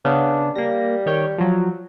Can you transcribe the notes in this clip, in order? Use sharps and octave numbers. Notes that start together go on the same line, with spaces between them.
C#3 B3 D4
G3 A#3 A#6
D#3 C#5 G5
F3 F#3